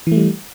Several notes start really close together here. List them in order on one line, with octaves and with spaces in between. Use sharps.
E3 A3 G3